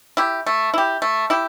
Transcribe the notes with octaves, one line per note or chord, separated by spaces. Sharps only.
E4 G4
A3
E4 G4
A3
E4 G4